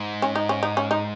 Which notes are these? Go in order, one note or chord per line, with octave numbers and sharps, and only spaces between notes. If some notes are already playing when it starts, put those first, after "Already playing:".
Already playing: G#2
C#4
D#4
C#4
D#4
C#4
D#4